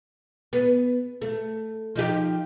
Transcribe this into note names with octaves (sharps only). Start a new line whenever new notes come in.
B3
A3
F3 D#4 G4